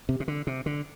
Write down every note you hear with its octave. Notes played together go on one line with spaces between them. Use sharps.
C3
C3
D3
C3
D3